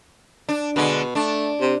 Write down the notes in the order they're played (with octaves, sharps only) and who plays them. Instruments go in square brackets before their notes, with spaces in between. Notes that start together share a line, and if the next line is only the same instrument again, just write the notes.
[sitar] D4
[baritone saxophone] B2 [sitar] D3 G#3
[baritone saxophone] A3 [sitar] D4
[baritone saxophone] C3